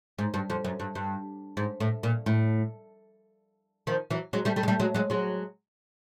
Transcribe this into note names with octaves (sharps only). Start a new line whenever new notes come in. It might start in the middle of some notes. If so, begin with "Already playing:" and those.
G#2
G2
F2
F#2
G2
G2
G#2
A2
A#2
A2
D#3 F3
E3 F#3
F#3 G#3
G3 A3
G3 A3
G#3
G3 A3
F#3 G#3
F#3 G#3
F#3 G#3